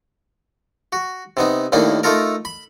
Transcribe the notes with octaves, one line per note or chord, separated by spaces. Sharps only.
F#4
C3 B3 D#4
D#2 A2 A#3 D4 D#4
A3 D#4 F4 A4 A#4
B5